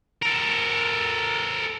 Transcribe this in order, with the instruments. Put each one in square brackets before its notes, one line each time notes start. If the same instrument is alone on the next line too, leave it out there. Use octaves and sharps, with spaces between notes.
[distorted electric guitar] A4 A#4